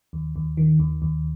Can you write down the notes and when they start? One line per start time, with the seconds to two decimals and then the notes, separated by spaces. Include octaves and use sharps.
0.13 D#2
0.36 D#2
0.57 D#3
0.79 D#2
1.02 D#2